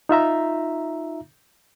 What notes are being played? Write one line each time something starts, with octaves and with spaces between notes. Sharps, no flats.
D#4 F4 E5 A#5